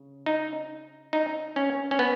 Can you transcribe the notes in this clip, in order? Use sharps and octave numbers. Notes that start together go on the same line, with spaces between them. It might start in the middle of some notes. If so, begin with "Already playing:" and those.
Already playing: C#3
D#4
D#4
C#4
C#4
B3